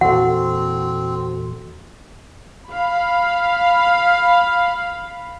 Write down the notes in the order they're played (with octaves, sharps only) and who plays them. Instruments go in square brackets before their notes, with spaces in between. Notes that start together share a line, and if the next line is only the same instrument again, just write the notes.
[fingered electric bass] E2 A#2 E3 [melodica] C4 [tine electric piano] F#4 A4 [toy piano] F#5
[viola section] F5 B5